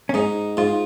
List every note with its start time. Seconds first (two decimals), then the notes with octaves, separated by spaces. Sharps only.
0.09 C#4
0.14 G#2 D#4
0.57 G#2 F4